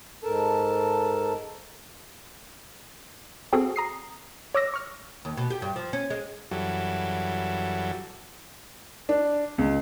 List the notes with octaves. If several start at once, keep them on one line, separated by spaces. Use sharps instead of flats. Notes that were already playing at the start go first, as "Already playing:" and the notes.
G#2 A4 A#4 A5
C4 F#4 G#4 A4
A#5 D#6 C7
C#5 D6 E6 A#6
C#6 F6
D#2
B2
G4
G2
F3
C#4
G#3
F#2 E3 F#3 G3 A4
D4
C#2